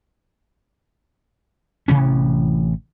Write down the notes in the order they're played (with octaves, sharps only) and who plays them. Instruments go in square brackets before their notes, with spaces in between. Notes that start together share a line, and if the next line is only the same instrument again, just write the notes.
[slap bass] A1 C3 E3 C#4